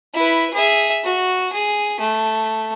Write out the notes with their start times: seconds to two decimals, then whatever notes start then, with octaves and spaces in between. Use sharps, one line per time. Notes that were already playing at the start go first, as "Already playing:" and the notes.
0.14 E4 B4
0.54 G#4 E5
1.04 F#4
1.53 G#4
2.00 A3